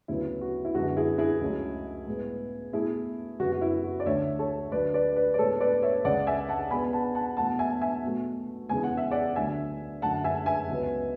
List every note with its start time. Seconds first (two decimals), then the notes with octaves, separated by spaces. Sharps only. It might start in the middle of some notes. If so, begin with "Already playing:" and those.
0.08 D2 C#3 F#3 B3 E4
0.41 F#4
0.65 E4
0.74 F#2 D3 G#3 B3 F#4
0.96 E4 G#4
1.18 E4 G#4
1.41 C#2 C#3 F#3 A3
2.07 A2 G#3 B3
2.73 B2 A3 E4 G#4
3.40 F#2 C#3 G#3 B3 F#4
3.52 F#4
3.61 E4
3.84 F#4
4.00 D5
4.05 D2 D3 A3 C#5 E5
4.39 A4 C#5
4.72 D2 D3 F#3 A3 B4 D5
4.94 B4 D5
5.16 B4 D5
5.34 D5
5.38 A2 G#3 B3 A4 C#5
5.60 B4 D5
5.82 C#5 E5
6.05 C#2 C#3 G#3 D5 F#5
6.27 E5 G#5
6.49 F#5 A5
6.70 B2 G#3 B3 G#5 B5
6.93 F#5 A5
7.15 F#5 A5
7.37 E2 B2 A3 F#5 A5
7.59 E5 G#5
7.81 E5 G#5
8.04 B2 F#3 A3
8.69 E2 C#3 E3 G#3 G#5
8.84 F#5
8.97 E5
9.11 D5 F#5
9.36 D2 D3 F#3 A3 E5 G#5
10.02 F#2 D3 A3 F#5 A5
10.24 E5 G#5
10.46 E5 G#5
10.68 C#2 C#3 F#3 B3